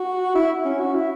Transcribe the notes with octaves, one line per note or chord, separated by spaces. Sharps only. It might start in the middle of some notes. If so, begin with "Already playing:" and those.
Already playing: F#4
E4
C#4
F#4
E4